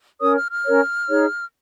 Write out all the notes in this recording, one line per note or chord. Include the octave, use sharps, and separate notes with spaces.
C#4 A#4 C#5 D#6
F6
F6
C#4 A#4 C#5
D#4 G#4 C#5